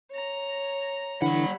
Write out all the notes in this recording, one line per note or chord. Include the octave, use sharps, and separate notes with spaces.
C#5 A#5
D3 E3 G3 F#5 B5